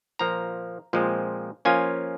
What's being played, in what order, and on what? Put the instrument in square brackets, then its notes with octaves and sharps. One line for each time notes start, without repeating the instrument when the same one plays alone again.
[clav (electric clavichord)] A#2 F3 A#3 A#5
A#2 F3 G#3 C4
F3 A#3 C#4 F4 G#5